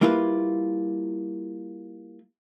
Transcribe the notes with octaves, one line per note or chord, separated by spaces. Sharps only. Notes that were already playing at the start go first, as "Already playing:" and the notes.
G3 A#3 E4 F4 B4